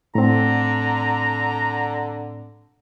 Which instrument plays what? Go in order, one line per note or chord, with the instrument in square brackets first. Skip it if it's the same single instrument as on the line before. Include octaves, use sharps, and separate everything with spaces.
[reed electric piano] A2 C4 [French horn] D3 [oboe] A#5